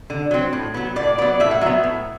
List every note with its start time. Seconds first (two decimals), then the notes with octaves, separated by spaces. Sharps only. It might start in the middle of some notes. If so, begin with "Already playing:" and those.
0.10 D3
0.31 F#3 C4
0.53 A2
0.74 F#3 B3
0.96 A2 D5
1.18 F#3 B3 D5
1.40 A2 E5
1.51 F#5
1.61 F#3 B3 E5
1.84 A2